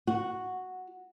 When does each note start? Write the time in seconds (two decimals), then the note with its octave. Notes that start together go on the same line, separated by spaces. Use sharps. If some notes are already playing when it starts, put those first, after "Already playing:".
0.07 F#4